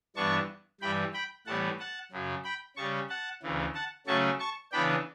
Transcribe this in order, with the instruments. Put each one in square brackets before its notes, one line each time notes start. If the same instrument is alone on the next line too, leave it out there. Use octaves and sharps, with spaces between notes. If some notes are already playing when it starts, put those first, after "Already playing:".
[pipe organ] G2 E3 B3 D4 A5 C#6
G2 E3 G3 G5 B5
G5 B5
A2 E3 G3 B3 F#5 A5
F#5 A5
F#2 C#3 F#3
G5 B5
C#3 G3 C#4 A5 C#6
F#5 A5
D2 C#3 E3
F#5 A5
C#3 F#3 A3 C#4 A5 C#6
A5 C#6
C#3 E3 B3 D4 G5 B5